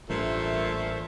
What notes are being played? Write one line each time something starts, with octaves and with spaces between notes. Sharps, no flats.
A1 G2 A#2 A3 C5 E5